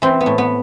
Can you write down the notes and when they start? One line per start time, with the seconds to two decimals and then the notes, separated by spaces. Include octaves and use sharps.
0.02 E3 C4
0.21 B3
0.26 A2
0.38 B3